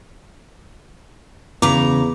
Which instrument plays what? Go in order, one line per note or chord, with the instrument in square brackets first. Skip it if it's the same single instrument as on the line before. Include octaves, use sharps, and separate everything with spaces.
[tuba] E2 [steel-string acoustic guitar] C#3 A#5 [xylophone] D6